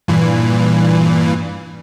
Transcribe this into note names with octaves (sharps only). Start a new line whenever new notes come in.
G2 A#2 E3